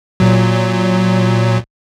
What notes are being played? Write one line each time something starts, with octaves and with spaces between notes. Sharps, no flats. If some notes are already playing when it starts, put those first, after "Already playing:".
A#2 F#3